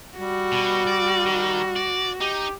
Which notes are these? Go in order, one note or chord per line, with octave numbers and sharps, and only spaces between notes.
G3 F#4
B2
D5
D#3
D5
D#4 G4